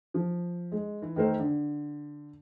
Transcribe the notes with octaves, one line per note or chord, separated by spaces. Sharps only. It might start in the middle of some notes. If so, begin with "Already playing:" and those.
F3
G#3
E3
D#3 A3 A#4 C5
D3